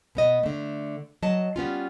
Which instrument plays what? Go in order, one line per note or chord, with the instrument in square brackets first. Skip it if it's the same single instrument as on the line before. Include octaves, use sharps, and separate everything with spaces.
[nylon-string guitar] B2 B3 D#5
D3 A3
F#3 D#5 A5
G3 B3 C#4 F4